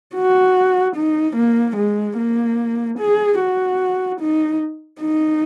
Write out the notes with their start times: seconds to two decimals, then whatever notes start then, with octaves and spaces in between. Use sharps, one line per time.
0.15 F#4
0.96 D#4
1.36 A#3
1.76 G#3
2.17 A#3
2.98 G#4
3.39 F#4
4.20 D#4
5.01 D#4